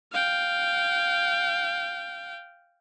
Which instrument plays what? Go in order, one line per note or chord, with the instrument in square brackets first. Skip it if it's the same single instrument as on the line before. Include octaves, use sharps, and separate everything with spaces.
[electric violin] F5 G5